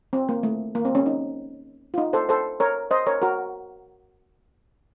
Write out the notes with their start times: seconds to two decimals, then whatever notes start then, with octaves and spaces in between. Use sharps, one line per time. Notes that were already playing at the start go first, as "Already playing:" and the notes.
0.13 C4
0.29 A#3
0.43 A3
0.75 A#3
0.85 C4
0.95 C#4
1.06 D#4
1.94 F4
1.98 D#4
2.13 A4 C5
2.29 A4 C5
2.60 A#4 C#5
2.91 C5 D#5
3.07 A#4 C#5
3.22 F#4 A#4